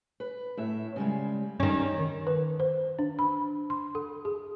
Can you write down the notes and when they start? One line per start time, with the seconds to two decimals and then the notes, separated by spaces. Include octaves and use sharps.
0.20 B4
0.57 A2 E5
0.96 C#3 G3 G#3
1.60 D#3 G3 C#4 G4
1.99 D#3
2.27 B4
2.60 C5
2.99 D4
3.19 B5
3.70 C6
3.95 A4
4.25 G#4